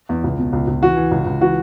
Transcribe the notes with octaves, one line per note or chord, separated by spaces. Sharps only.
E2
C#2
B2
C#2
C#2
E3 F#4
E3
C#2
C#2
E3 F#4